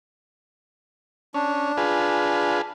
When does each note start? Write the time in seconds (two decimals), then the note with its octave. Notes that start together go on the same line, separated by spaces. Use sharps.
1.34 C#4 D4
1.77 F4 G#4 B4